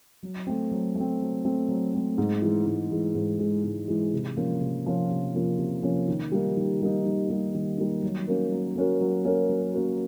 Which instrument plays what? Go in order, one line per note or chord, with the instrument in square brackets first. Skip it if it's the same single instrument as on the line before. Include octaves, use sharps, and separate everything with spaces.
[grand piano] F#3
A3 C4
F#3
A3 C4
F#3
A3 C4
F#3
A3 C4
G#2
E3 G#3
G#2
E3 G#3
G#2
E3 G#3
G#2
E3 G#3
C3
F3 A#3 C#4 F4
C3
F3 A#3 C#4 F4
C3
F3 A#3 C#4 F4
C3
F3 A#3 C#4 F4
D#3
G3 A#3 D#4
D#3
G3 A#3 D#4
D#3
G3 A#3 D#4
D#3
G3 A#3 D#4
F#3
A#3 C#4 F#4 A#4
F#3
A#3 C#4 F#4 A#4
F#3
A#3 C#4 F#4 A#4
F#3
A#3 C#4 F#4 A#4